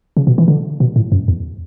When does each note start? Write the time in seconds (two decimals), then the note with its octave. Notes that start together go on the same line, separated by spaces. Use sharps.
0.17 C#3
0.27 B2
0.38 E3
0.48 D3
0.80 B2
0.96 A2
1.12 F#2
1.28 E2